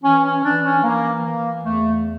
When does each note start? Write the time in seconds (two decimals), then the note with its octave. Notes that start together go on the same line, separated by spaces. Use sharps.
0.03 E3 C#4
0.24 C#4
0.44 E3 D4
0.65 C#4
0.83 E3 A#3
1.23 E3 A#3
1.63 E2 A3